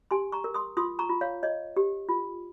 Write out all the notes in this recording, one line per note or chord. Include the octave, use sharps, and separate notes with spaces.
G4 G#5 C6
A#5 C#6
A#4
C6 D#6
F4 C6 D#6
A#5 C#6
F4
C#5 F5
C#5 D#5
G4
F4